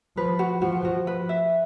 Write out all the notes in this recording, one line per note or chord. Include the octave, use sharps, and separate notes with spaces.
F3 B4
F#4
F3 F#4
F#4
B4
E5